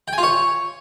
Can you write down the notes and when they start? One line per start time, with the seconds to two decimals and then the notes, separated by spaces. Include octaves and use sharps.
0.08 G5
0.13 G#5
0.18 F4
0.23 C#5